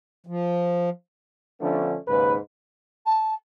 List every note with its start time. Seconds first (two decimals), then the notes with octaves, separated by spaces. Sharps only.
0.27 F3
1.61 D3 F3 A3 B3 C#4 D4
2.08 D#2 G#2 C#3 B4
3.06 A5